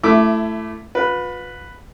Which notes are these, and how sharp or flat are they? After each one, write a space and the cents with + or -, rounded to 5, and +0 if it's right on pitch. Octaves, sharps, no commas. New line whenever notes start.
A3 +0 E4 +20 D6 +0
F4 +45 B4 +0